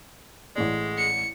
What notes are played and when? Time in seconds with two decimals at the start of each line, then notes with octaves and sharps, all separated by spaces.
0.56 A1 A2 G#3 D5
0.98 C#7